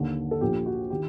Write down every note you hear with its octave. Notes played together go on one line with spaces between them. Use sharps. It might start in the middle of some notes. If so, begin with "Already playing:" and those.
Already playing: D#2 D3
A4
A#1 A#2 G4
F#4
D#3 G4